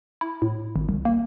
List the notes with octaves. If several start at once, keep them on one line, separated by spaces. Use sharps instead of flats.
E4
A2
G#1
C2
A#3